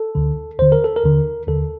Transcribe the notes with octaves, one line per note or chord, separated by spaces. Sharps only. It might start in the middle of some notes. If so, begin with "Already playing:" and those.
Already playing: A4
D2 D3
D#2 D3 C5
A#4
A4
A#4
D#2 D3
D#2 D3 A4